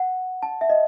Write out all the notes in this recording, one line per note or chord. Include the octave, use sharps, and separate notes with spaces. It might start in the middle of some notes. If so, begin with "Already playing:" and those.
Already playing: F#5
A5
E5
D#5